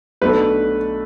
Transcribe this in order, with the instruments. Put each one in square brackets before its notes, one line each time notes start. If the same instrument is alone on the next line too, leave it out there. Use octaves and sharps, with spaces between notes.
[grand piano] B1 B2 A3 D4 A4 [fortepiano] B4